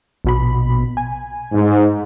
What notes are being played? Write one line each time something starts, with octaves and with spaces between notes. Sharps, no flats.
A#1 B2 B5
G#5
G#2